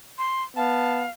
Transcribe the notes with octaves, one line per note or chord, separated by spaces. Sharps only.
C6
B3 F5 A5